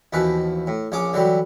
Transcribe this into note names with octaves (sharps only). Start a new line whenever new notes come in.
D#2 B2 E3 F3 B4
A2
A#1 C#3 C#5 D6 D#6
D3 E3 F#3 G3